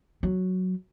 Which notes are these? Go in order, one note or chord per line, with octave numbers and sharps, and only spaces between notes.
F#3